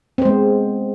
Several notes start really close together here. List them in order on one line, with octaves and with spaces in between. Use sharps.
C4 C5 G#3 B3